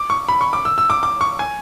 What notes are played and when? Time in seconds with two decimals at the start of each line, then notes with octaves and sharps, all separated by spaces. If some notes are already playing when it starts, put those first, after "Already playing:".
Already playing: D6
0.10 C#6
0.29 B5
0.41 C#6
0.53 D6
0.65 E6
0.78 E6
0.90 D6
1.03 D6
1.21 C#6
1.39 G#5